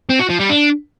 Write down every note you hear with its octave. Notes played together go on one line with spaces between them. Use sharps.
C4
F#4
F3
G3
D4